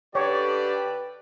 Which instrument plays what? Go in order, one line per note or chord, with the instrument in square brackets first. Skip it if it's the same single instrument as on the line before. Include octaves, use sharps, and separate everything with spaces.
[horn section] D3 A4 D5 [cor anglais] G4 [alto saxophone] B4 [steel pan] C#5